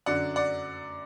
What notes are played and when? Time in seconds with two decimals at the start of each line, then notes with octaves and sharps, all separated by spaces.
0.06 F#2 D3 F#3 D5 F#5
0.36 D5 F#5